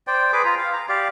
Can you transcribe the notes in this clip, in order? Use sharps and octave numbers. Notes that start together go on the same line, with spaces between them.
C5 D5 G5
G#4 B4 D6
F4 A#5
F5
A#5
G4 D5 F5